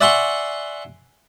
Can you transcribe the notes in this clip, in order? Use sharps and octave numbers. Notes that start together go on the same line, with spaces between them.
D5 E5 F#5 G#5 C6 C#6